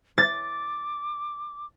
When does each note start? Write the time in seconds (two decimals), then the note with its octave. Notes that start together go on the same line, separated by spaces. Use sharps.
0.18 D6 A6